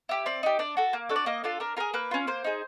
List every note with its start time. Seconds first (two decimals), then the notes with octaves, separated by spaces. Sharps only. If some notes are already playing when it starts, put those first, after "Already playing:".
0.09 E4 G4
0.26 C4 D5
0.43 D#4 G4
0.59 D4 D5
0.77 F#4 A4
0.93 A#3
1.09 D4 F#4 A4
1.16 D5
1.26 A#3 D#5
1.44 D4 F4 A4
1.60 D4 A#4
1.77 F4 G#4 A#4
1.94 A#3 B4
2.11 C#4 F4
2.27 A#3 C5
2.44 D#4 G#4